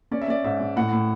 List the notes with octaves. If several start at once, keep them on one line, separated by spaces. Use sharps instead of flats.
C#4 D5
E5
C#4 D5
G#2 E5
G#2
A2 F#5
A2